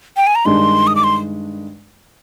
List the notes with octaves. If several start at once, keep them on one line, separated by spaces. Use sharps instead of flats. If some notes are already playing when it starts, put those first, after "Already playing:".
G5
G#5
A#5
G2 D#3 G#3 D4 C6
D#6
D6
C6